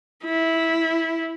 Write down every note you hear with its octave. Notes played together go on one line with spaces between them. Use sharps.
E4